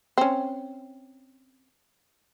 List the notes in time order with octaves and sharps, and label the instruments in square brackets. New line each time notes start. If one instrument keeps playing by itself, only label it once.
[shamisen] C4 C#4